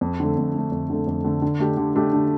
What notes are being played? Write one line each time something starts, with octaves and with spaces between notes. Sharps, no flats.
F2
D3 A3
F2
D3 A3
F2
D3 A3
F2
D3 A3
D3
A3 D4 G4
D3
A3 D4 G4
D3